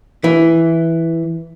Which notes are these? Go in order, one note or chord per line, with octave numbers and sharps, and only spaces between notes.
E3